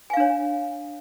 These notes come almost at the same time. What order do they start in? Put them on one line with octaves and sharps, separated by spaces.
G#5 F5 D4 C#5